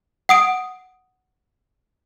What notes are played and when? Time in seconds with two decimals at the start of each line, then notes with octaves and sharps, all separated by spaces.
0.29 F#5 D#6 D7